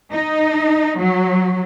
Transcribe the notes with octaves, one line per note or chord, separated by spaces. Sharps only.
D#4
F#3